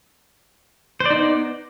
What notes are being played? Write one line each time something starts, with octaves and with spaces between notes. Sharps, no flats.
B3 D#4 C5 D5